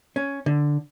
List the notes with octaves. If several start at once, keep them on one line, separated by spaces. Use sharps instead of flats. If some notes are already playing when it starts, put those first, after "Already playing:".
C#4
D3